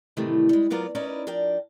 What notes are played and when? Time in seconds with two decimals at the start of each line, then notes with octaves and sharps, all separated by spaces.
0.17 A2 C3 D#3 E3 G3 A3
0.49 G3 G#3
0.70 F#3 B3 F4 A#4 D5
0.95 C#4 D#4 E4 A#4 B4 D5
1.27 F3 D4 A#4 D5 G5